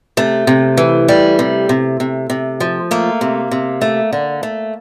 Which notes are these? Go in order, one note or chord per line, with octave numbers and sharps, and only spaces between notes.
C3 A3
C3
E3
G3
C3
C3
C3
C3
F3
A3 A#3
C3
C3
A3
D3
A3